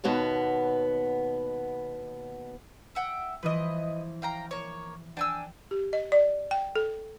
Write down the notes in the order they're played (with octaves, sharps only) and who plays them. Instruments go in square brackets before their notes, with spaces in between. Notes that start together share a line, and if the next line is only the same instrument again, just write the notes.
[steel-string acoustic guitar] D#2 B2 B3 C#5 A5
[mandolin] E5 F#5 G5
[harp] E3 F3 [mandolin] B4 D#5
[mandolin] F5 G5 A#5
A#3 C#5
[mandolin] D4 G#5 E6 [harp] G5
[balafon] G4
D#5
D5
G5
A4